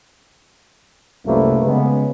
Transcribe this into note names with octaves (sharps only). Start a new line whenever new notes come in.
C2 F#2 C3 A3 A#3 B4
C#3 G#3 B3